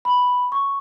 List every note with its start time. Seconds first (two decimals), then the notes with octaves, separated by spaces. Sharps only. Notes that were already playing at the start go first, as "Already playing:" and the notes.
0.05 B5
0.52 C#6